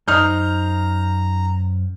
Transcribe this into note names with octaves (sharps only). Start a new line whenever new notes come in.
F#2 D#4 C5 A#5 F6 G6